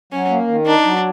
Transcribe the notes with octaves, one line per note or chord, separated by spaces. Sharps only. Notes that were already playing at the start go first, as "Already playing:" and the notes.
F#3 C#4
A#3
D#3
D4 D#4
F#3